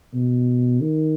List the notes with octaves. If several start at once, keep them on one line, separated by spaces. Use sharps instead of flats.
B2
D#3